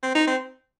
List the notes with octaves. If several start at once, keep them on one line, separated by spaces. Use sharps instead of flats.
C4
D#4
C4